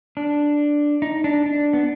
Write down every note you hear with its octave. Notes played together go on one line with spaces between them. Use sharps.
D4
D#4
D4
D4
B3